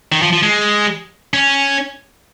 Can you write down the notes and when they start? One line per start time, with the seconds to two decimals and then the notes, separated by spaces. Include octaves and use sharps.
0.12 D#3
0.22 F3
0.33 F3
0.42 G#3
1.34 C#4